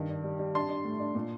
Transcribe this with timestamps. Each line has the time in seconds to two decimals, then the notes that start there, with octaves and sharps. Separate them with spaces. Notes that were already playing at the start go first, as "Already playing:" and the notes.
Already playing: G2 D#3
0.09 D4
0.24 G3
0.39 G3
0.54 D4 A5 C6
0.69 D4
0.85 A2
1.00 D4
1.15 A#2